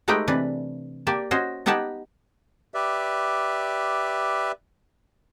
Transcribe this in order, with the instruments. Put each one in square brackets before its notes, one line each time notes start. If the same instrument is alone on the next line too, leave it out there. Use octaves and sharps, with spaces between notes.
[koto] G#3 A3 D#4 G4 B4 G5
C3 E3 D4 B4
A#3 G4 D5 A5
C#4 F#4 C5 D#5
B3 D#4 G4 F#5 G#5 A5
[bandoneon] G4 B4 D5 E5